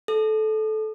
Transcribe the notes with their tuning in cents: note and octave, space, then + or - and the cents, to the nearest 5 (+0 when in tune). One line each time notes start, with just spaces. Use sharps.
A4 -20